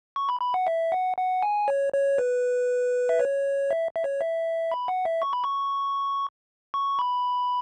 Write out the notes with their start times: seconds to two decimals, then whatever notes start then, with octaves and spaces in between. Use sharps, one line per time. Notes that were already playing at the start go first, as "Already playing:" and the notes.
0.16 C#6
0.29 B5
0.41 B5
0.54 F#5
0.67 E5
0.92 F#5
1.17 F#5
1.42 G#5
1.68 C#5
1.93 C#5
2.18 B4
3.09 E5
3.20 C#5
3.71 E5
3.96 E5
4.04 C#5
4.21 E5
4.71 B5
4.88 F#5
5.05 E5
5.22 C#6
5.33 B5
5.44 C#6
6.74 C#6
6.99 B5